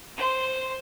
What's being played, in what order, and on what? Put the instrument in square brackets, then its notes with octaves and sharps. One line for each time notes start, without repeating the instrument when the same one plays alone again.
[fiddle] C5 C6